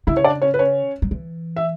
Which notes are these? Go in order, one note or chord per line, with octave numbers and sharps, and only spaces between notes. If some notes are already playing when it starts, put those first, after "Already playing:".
C#3 E4 E5
C#5
D4 D5
C#4 C#5
B4
C#4 C#5
F#3
E3
E5